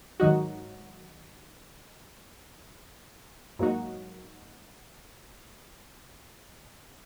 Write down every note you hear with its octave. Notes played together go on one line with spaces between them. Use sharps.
G#2 D#3 F#3 D#4 F#4
G#2 F#3 A#3 D#4 F#4